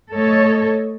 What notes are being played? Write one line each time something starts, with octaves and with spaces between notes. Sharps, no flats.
A3 A4 C#5 D#5